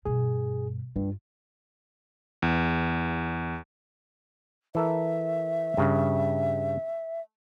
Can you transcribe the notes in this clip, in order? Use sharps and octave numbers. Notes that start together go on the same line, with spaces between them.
G2 B2 G#4
G2 F4
E2
E3 A4 A#4 E5
G2 C#3